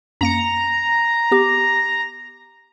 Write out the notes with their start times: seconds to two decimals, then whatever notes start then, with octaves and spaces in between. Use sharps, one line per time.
0.21 F#2 A#3 A#5 C#7
1.31 B3 G4 D6